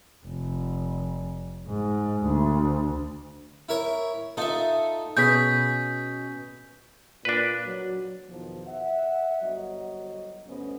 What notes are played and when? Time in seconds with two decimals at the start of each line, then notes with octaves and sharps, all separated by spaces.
0.26 F1
1.67 G#2
2.24 D2
3.69 E4 A#4 C#5
4.37 D#4 F4 A4 E5
5.17 B2 C#4 G#4 G6 B6
7.25 A#2 D4 B4
7.66 F#3
8.29 E2 B2 D#3 F3
8.68 E5 F#5
9.42 G1 F#3 D#5
10.48 G1 D2 B3 C#4 C5 D#5